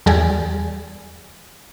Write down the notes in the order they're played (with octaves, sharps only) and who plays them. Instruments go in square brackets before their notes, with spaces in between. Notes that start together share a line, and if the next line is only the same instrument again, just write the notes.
[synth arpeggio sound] E2 G3 G#4